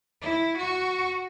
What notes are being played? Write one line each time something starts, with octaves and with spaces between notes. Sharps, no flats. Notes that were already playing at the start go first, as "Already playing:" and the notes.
E4
F#4